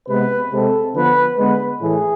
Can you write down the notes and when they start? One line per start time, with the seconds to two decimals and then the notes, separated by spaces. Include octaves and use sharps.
0.09 C3 G#3 B3 B4
0.51 C3 G#3 C4 A4
0.94 D3 F3 B3 B4
1.38 D3 G#3 B3 B4
1.80 A2 E3 A3 G#4